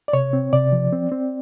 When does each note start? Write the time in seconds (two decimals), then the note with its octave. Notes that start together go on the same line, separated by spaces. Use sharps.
0.08 D5
0.13 C3 C#5
0.33 C4
0.53 C3 D5
0.72 F3
0.92 C4
1.12 C4